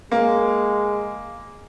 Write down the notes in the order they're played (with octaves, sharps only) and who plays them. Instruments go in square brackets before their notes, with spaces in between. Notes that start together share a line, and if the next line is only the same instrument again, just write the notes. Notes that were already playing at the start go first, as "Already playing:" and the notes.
[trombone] G#3 [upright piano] A#3